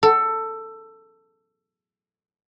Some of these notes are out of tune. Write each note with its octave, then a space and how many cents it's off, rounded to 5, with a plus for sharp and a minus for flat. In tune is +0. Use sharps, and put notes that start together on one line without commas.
A4 +15